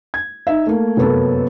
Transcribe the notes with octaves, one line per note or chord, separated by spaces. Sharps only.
G#6
D#4 E5
A3 A#3
F1 F#2 A#3 B3 C#4 A4